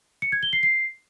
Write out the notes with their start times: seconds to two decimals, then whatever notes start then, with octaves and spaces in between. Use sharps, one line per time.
0.22 C#7
0.32 G#6
0.43 G7
0.53 C7
0.63 C7